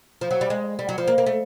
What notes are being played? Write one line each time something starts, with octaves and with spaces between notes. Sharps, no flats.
F3
F#3
G3
G#3
G3
F#3
F3
A#3
A#3
A3